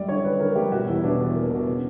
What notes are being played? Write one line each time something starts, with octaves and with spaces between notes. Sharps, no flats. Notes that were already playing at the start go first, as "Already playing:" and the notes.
Already playing: F#2 G3 D5
D3 C#5
D3 B4
D3 A#4
G3 G4
B2 F#4
E2 E4
B2 D4
E2
A#3
B2
C#3